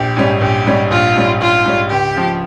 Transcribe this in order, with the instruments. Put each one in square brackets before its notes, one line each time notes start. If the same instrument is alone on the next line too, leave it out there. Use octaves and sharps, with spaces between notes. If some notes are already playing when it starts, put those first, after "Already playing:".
Already playing: [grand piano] A#1 [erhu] G4
[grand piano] G#2 G3 C#4
[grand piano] A#1 [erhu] G4
[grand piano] G#2 G3 C#4
[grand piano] A#1 [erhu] F4
[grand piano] G#2 G3 C#4
[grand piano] A#1 [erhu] F4
[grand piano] G#2 G3 C#4
[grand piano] C#2 [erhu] G4
[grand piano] C#3 F3